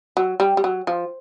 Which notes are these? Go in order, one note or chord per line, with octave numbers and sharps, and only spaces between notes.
F#3
G3
G3
F#3
F3